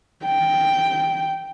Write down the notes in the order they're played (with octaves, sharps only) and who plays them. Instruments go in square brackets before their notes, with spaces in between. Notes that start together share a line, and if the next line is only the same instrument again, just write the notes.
[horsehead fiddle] G5